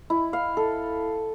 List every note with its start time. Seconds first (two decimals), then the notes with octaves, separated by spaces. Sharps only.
0.10 E4
0.33 F5
0.57 A4